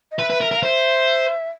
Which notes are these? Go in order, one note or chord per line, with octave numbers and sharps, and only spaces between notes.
D#5
B4 E5
B4
A#4
A#4
F5
C5 E5